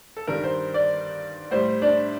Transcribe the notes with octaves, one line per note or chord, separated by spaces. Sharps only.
A4
G2 D#3 G3 A#4
C5
D5
A2 G3 C5
D4